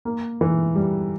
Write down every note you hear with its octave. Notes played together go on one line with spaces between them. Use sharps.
A#3
E3
G3